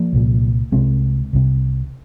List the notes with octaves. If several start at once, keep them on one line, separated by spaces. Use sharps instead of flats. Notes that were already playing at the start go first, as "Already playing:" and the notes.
Already playing: F3 A#3
C2 A#2
C2 C3 G#3 C4
C2 C3